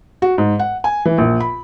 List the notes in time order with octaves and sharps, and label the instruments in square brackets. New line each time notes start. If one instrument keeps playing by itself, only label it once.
[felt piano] F#4
G#2
F#5
G#5
E3
A#1
B5